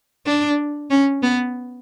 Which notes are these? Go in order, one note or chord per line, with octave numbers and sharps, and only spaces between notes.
D4
C#4
B3